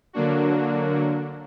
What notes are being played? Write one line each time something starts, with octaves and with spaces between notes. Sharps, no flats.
D3 F#3 A#3 D4 F#4